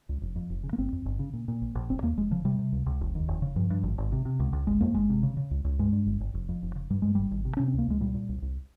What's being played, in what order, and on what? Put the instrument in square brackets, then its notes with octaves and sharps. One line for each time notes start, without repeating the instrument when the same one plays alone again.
[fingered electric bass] C#2
F1
F2
F1
C#3
A#3
G1 C4
F2
G1
C#3
A#2
A#2
A#1
A#1
F1 C4
D#2 A#3
F1 G#3
C#3 F3
C3 G3
C3
C#2
C#2
F1
D#2
F1
C#3
G2 F3
G2
G#1
G#1
C3
C3
C#2
C#2
G1 G#3
F2 A#3
G1 G#3
C3
C#3
C#3
C#2
C#2
G2 G#3
G2
G1
G1
F1
F2
F1
C#3
G2 G3
G2 G#3
G#1 G3
G#1
C3
C3 C#4
C4
C#2 A#3
C#2 G#3
A#2 G3
A#2
C2
C2